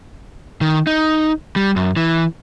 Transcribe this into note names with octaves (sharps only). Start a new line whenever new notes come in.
D#3
D#4
G3
F#2
E3